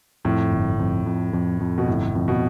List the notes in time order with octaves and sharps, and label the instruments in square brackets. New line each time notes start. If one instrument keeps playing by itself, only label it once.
[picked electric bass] F2 [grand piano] A2
[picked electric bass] G1
F2
F2
F2
F2
[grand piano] B2
[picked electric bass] G1 [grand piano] A2
[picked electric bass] F2
[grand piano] B2